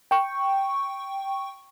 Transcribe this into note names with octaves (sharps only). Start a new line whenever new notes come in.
G5 C#6